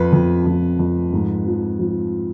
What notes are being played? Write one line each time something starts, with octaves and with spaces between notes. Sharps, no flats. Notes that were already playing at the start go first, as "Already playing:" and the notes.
Already playing: F2 B4
F2
F2
F2
G#2
F3
F3